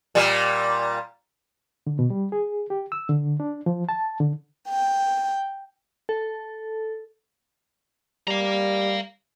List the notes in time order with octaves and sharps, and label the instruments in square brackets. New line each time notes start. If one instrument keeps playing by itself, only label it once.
[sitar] A#2 G3
[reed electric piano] D3
B2
G3
G#4
G4
E6
D3
D4
F3
A5
D3
[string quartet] G5
[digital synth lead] A4
[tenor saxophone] G3 [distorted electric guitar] F5 A#5